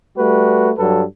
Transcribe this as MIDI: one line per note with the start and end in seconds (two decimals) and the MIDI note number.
0.17 0.71 55
0.17 0.71 57
0.17 0.71 66
0.17 0.71 71
0.78 1.03 43
0.78 1.03 54
0.78 1.03 69
0.78 1.03 71